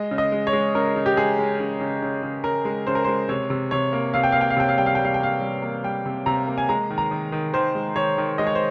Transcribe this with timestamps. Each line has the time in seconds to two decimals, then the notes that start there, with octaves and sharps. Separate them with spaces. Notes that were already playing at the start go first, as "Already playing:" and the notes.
Already playing: G#3 D#5
0.11 C#3
0.18 D#5
0.32 G#3
0.47 C#5
0.53 G#3
0.75 C#3 A#4
0.96 C#3
1.06 G4
1.17 G#3 G#4
1.39 G#3
1.60 C#3
1.81 C#3
2.02 C#3
2.23 C#3
2.44 C#3 A#4
2.65 G#3
2.87 C#3 C5
2.95 A#4
3.05 G#3 C5
3.29 C3 C#5
3.50 C3
3.71 C3 C#5
3.93 A#3
4.14 C3 F5
4.24 G5
4.32 A#3 F5
4.41 G5
4.50 F5
4.57 C3 G5
4.69 F5
4.78 G3 G5
4.86 F5
4.95 G3 G5
5.05 F5
5.14 G5
5.20 A#3 F5
5.41 G3
5.62 A#3
5.84 G3 G5
6.06 C3
6.26 C3 A#5
6.47 A#3
6.58 G#5
6.69 G#3 A#5
6.90 D#3
6.98 A#5
7.11 D#3
7.32 D#3
7.54 D#3 C5
7.75 G#3
7.96 D#3 C#5
8.18 D#3
8.38 G#3 D#5
8.47 C#5
8.55 C5